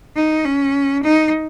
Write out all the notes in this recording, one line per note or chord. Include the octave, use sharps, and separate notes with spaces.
D#4
C#4
D#4